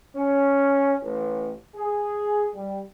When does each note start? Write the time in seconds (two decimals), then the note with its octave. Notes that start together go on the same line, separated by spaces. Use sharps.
0.15 C#4
1.02 A1
1.75 G#4
2.54 G3